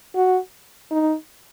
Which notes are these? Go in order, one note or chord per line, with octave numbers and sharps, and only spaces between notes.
F#4
D#4